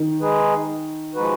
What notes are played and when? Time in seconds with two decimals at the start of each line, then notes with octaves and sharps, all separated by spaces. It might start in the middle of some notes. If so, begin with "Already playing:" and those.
Already playing: D#3
0.20 G#3 D#4 G#4 B4
1.14 F3 G#3 D#4 F#4 B4